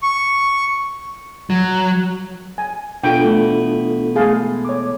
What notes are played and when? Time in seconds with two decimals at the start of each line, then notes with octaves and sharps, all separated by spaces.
0.03 C#6
1.50 F#3
2.58 G#5
3.04 B2 B3 D4 E4 F4 A4 G5
3.23 E3 A3
4.16 G#3 A3 G#4 A4 F5 A5
4.65 C#5 D6